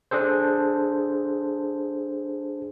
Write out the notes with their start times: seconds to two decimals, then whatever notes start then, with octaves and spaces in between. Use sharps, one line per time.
0.11 D4 G#4 A4 C5